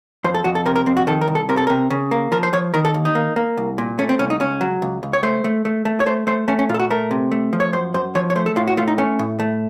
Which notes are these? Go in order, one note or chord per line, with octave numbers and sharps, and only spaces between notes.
F2 C5
A4
F2 F#4
A4
C3 A#4
A#4
F2 C4
F#4
D#3 A4
A#4
C2
A4
C3 A#4
A4
C3 A#4
C#3
A#3
F3 A#4
C5
F3 C#5
D#3 A#4
A4
D#2
D#4
A#3
A#3
C2
A#2
A3 C#4
C4
C2 C#4
D#4
C#2 C#4
F#3
C#2
C#2
C#5
A3 C5
A3
A3
A3
C#5
A3 C5
A3 C5
A3 C#4
C#4
A#2 F4
A4
F#4
A3 A#4
C3
A3
F3
C#5
F#2 C5
F#2 C5
F3 C#5
C#5
A3 C5
A4
A2 F4
F#4
A3 F4
D#4
A3 C#4
A2
A3